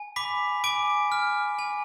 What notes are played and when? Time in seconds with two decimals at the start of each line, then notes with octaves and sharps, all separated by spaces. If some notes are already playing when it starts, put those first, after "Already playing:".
Already playing: G#5
0.16 B5 D6 B6
0.64 G#5 D6 D7
1.12 F6
1.59 G#5